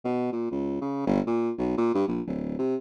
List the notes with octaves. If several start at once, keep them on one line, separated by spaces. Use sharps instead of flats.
B2
A#2
C#2
C#3
G1
A#2
B1
A#2
G2
A#1
D1
C3